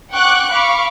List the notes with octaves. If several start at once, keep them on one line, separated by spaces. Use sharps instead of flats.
F#5 G5 C#6 D6 F#6
F5 B5 C#6 D6